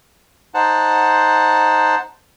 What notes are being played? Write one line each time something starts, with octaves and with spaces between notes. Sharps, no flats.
D#4 C5 F#5 A5